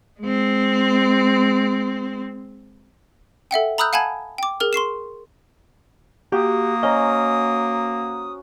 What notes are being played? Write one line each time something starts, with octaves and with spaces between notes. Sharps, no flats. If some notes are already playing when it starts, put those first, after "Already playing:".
G#3 C4
A4 E5 F#5 G5
A#5 B5 D#6 E6 F#6 G6
F5 F#5 G#5 A5 B5 G#6
G5 D6
G#4 A#4 F6
C6 C#6 C7 E7
A#3 F#4 G4 D#6
C#4 C5 D#5 A#5